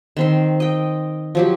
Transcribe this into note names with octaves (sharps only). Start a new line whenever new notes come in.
D#3 C4 C6
D#5 G5
F3 F#3 G4